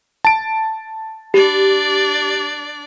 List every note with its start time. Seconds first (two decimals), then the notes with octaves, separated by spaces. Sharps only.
0.25 A5 D7
1.34 D4 G4 D5